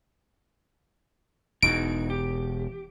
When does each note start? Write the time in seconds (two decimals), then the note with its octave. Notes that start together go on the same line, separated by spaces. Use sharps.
1.63 E1 E2 D#4 F#4 D7
2.10 G4